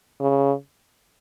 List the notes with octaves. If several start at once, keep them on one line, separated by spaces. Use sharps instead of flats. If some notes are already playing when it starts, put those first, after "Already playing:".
C#3